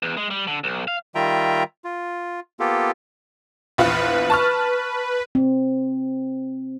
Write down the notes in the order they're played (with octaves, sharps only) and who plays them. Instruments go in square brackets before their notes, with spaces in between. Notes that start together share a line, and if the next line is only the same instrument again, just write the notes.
[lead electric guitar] E2
G#3
G3
D3
B1
F5
[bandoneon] D#3 G3 F4 E5 G5 A#5
F4
A#3 B3 F4 G4 A4
[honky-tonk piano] A#1 E2 F4 [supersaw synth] B4
[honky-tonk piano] A5 C#6 F6
[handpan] C4